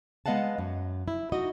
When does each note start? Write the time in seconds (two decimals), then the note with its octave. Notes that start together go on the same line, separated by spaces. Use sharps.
0.26 G#3 B3 D#5 F5 F#5 A5
0.58 F#2
1.08 E4
1.32 D#4 F#4 D#5